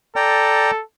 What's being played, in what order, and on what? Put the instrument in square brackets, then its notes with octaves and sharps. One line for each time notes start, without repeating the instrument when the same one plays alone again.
[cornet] A4 [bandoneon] D5 G5 A#5